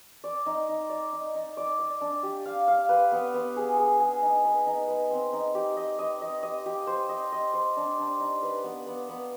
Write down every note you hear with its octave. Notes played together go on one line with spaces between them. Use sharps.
D5
D#4
D#4
D5
D#4
D#4
D5
D5
D4
G4
F5
F5
B4
B3
B3
G#4
G#4
G#4
D#4
B4
D#4
B4
C4
D#4
G4
D#5
D#5
D#5
D#5
G4
C5
D#5
D#5
C5
D4
D4
D#4
B4
B3
B3
B3